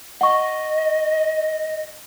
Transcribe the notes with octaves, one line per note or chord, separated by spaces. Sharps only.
D#5 F#5 C#6